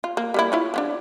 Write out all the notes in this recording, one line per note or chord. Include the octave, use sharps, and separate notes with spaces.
F4
A#3
G3 A#3 E4
E4 F4 C#5
F3 B3 D4